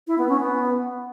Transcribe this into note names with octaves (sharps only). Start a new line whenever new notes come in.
E4
B3
C#4
B3